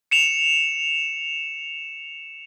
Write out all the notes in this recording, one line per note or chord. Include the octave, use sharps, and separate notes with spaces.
C#7 E7 F7